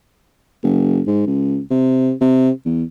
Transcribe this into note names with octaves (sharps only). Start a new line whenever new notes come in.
F#1
G#2
C#2
C3
C3
E2